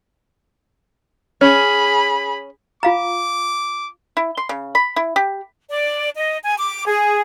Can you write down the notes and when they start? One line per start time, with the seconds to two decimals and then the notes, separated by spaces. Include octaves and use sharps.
1.41 C#4 G#4 B5
2.83 F4 F5 A#5 D6
4.17 E4
4.37 C6
4.49 C#3
4.75 B5
4.96 E4
5.16 G4
5.70 D5
6.15 D#5
6.43 G#5
6.58 D6
6.86 G#4